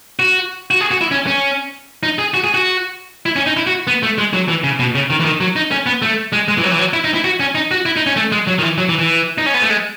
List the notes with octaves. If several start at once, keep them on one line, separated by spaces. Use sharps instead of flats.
F#4
F#4
G#4
F#4
E4
C#4
C#4
D#4
G#4
F#4
G#4
F#4
E4
C#4
D#4
E4
F#4
B3
A3
G#3
F#3
E3
C#3
B2
C#3
D#3
E3
D#3
F#3
D#4
C#4
B3
A3
G#3
G#3
E3
F#3
E3
F#3
E4
D#4
E4
F#4
C#4
D#4
F#4
E4
D#4
C#4
A3
G#3
F#3
D#3
E3
F#3
E3
E3
D#4
C#4
B3
A3
G#3